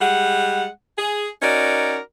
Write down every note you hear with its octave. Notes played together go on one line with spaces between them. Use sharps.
G3 G#3 F#5
G#4
C#4 D#4 F#4 A#4 D5